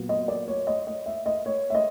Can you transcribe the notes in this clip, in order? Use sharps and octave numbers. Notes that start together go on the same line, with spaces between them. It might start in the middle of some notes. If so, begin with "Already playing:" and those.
Already playing: A#2 F#3 B3
D#5
D5
C#5
D#5
D#5
E5
D#5
C#5
E5
D#5